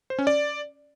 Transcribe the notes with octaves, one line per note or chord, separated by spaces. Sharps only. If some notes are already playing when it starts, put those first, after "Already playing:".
C5
C#4
D5